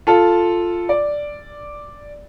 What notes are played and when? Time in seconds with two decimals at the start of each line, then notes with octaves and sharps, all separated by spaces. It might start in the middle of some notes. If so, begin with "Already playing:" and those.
0.07 F4 A4
0.89 D5